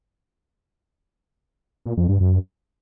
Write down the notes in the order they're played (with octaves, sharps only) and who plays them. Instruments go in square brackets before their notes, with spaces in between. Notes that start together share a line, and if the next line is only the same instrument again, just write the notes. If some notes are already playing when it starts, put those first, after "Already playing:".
[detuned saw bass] A#2
F2
G2
F#2